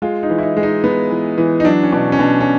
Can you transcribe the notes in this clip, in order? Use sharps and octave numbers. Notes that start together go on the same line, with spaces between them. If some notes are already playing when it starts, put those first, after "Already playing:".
G#3 F4
D#4
E3
E4
D#4
G#3
D#4
B3
E3
E3
D#4
F#3 D4
C#4
B2 D4
C#4
B2 D4
C#4